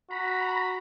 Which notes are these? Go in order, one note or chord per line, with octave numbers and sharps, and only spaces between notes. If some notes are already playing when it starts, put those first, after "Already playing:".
F#4 A#5 B5